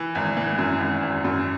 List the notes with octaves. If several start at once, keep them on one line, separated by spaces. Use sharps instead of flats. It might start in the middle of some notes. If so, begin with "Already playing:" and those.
Already playing: E3
G#1
E3
F#2
G#1
G#1
F#2